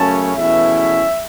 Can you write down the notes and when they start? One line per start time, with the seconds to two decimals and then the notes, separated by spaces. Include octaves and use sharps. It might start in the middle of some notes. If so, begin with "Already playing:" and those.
Already playing: F#2 C#3 A3 C#4 A5
0.36 E2 B2 A3 C#4 E4 E5